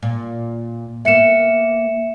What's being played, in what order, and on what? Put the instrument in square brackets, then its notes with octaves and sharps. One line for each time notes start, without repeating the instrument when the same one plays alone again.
[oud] A#2
[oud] A#3 B3 [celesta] E5 C#7 E7